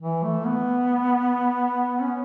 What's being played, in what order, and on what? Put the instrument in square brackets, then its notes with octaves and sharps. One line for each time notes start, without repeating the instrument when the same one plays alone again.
[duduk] E3
A3
B3
C#4